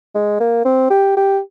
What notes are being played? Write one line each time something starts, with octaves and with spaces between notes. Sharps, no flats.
G#3
A#3
C4
G4
G4